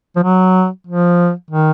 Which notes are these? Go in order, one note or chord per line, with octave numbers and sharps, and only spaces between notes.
F3
F#3
F3
D#3